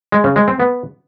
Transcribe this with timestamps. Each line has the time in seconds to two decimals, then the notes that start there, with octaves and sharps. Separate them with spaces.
0.12 G#3
0.24 C#3
0.36 G#3
0.48 C4
0.60 B3